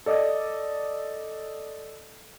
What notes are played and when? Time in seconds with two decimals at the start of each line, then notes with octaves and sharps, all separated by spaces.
0.06 A4 D5 D#5